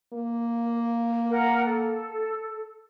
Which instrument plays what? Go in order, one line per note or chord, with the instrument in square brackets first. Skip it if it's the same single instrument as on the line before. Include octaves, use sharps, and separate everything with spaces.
[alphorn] A#3
[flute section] A#4 F#5
A4